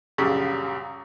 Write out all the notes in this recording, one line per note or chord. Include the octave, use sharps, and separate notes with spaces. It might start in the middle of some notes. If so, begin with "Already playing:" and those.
A#1 F#2 C#3 G3